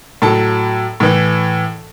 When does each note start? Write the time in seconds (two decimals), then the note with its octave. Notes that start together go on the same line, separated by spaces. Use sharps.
0.22 A2 F#3 A4 A5
1.00 A2 E3